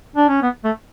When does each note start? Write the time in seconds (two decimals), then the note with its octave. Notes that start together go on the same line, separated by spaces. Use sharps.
0.16 D4
0.29 C#4
0.42 B3
0.64 A3